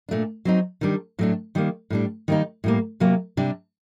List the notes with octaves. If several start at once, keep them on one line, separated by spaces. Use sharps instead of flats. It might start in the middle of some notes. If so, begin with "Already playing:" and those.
A#2 A3 D4
F#3 C4 D#4
D#3 G3 D4
A2 F#3 A3 D4
D#3 G3 A#3
A2 G3 D4
D#3 G3 A#3 D#4
A2 G3 A#3
C3 F#3 A#3
C3 G3 D4